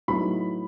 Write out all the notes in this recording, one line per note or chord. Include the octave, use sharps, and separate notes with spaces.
A2 F#3 B3 D#4 B5